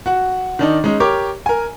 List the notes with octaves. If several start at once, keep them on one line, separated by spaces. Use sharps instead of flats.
F#4 F#5
D#3 D4 D#4
G#3 C#4 D#4
G4 A#4 C#5 D6
A#4 G#5